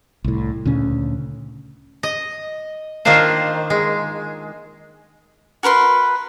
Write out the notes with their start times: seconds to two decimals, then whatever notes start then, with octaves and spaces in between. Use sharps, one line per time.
0.24 C2 A2
0.66 D2 A#2 C#3 C#4
2.03 D#5
3.05 D#3 A#3 D4 F4 C5
3.70 G#3
5.63 F#4 A#4 B4 C6